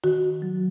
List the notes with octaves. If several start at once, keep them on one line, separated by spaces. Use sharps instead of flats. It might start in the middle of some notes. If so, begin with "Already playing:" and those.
D#3 F#4
F#3